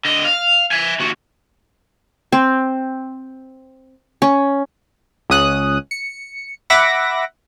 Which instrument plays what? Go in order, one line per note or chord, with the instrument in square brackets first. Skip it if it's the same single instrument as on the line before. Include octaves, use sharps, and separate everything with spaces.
[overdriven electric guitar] D3 D#5
F5
E5 G#5
D#2 F#4
[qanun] C4
C#4
[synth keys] C#2 C#4 D#6 F#6
C#7
E5 F#5 B5 D6 A#6